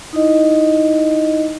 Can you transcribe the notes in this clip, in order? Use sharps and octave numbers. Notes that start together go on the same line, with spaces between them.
D#4 E4 D#5